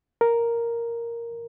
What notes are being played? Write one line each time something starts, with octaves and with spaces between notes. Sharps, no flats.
A#4